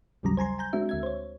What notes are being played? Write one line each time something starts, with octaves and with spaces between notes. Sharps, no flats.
A1 D#2 C#3 F#3 G3 A#5
C5 G#5 A#5 C6
G#5 A#5 G6
G#3 C4 D4 F#4 E5
D2 E5 G#6
C5 C#5